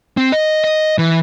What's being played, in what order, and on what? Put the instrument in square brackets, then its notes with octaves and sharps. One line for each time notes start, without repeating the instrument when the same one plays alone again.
[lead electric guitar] C4
D#5
D#5
E3